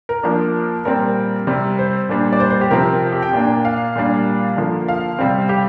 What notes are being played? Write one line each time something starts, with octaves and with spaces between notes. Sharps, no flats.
A#4
F3 A#3 D4
A#2 G3 C4 A#4
C3 G3 C4
C5
A#2 G3 D4
D5
C5
C5
G4
C3 F3 C4 A#4
G4
G5
A#2 A#3 D4
F5
A#2 G3 D4
D3 F3 A#3
F5
C3 G3 C4
G4